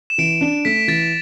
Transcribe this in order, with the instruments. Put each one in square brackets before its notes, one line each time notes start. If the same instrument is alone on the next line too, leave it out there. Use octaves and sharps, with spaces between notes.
[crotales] E7
[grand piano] E3 [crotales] D7
[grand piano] D4
[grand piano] A3 [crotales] B6
[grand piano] E3 [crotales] A6